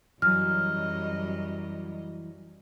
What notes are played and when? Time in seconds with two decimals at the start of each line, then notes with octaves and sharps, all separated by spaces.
0.22 F#2 E3 F#3 G3 D#5 F6